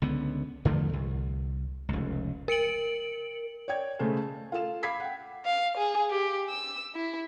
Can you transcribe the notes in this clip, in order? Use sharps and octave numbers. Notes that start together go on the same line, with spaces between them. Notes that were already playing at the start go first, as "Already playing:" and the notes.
C#2 D3 B3
E2 D3 F3 A3
C2
F1 C#2
A#4 C#7 D7 F#7
C#5 D5 G5 G#6
C#3 G#3 A3 A4 C5
A5
F4 A4 F5 E7
F5 B5 D6 G#6 B6 C7
F#5 G5
F5
G#4
G4
E6
E4